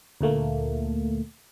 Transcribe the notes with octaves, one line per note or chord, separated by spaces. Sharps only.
D2 A#2 A3 A#3